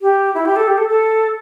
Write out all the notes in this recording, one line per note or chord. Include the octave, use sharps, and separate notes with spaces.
G4
E4
G4
A4
G4
A4
A4